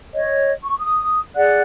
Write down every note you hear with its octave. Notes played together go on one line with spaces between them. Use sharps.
C#5 D#5
C#6
D#6
G#4 D5 F#5 F#6